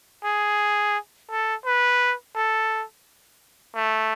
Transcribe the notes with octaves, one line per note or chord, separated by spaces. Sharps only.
G#4
A4
B4
A4
A3